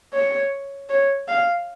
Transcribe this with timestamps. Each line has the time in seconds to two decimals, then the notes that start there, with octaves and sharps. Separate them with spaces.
0.13 C#5
0.89 C#5
1.27 F5